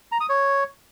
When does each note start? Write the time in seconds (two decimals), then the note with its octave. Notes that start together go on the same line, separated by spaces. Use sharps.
0.12 A#5
0.20 D#6
0.29 C#5